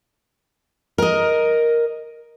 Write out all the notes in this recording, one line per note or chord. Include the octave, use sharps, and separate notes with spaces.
A#4 D#5